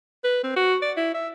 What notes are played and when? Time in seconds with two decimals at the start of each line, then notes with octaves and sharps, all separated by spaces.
0.24 B4
0.44 C4
0.57 F#4
0.82 D5
0.97 E4
1.14 E5